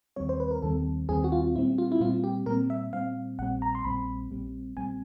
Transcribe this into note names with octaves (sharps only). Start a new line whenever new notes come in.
D#2 D#3 G3 C4 C#5
C5
B4
A#4
D#2 D#3 G3 C4 A4
D#2 D#3 G3 C4 G#4
F#4
F4
A#2 G3 C4 E4
F4
E4
A#2 G3 C4 F4
G4
A#2 G3 C4 A#4
E5
A#2 G3 C4 F5
A#1 A#2 G3 C4 F#5
A#5
C6
A#1 A#2 G3 C4 B5
A#1 A#2 G3 C4
A#1 A#2 G3 C4 G#5